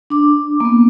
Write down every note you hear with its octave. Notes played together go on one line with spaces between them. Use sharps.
D4 D6
A#3 B3